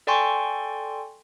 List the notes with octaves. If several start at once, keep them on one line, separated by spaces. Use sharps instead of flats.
A4 D5 G5 G#5 C6 C#6